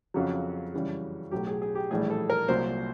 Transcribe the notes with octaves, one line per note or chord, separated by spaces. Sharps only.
F2 C#3 F#3 F#4
F#2 C#3 E3 G3
B1 A2 F#3 G4
G#4
G#4
G4
A#1 A2 E3 G3 G#4
A4
A#4
C2 A#2 F#3 C5